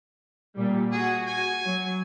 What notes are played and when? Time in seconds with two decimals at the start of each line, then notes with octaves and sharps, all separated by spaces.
0.57 A#2 G3
0.92 F#4 G#4
1.27 G#5
1.65 F#3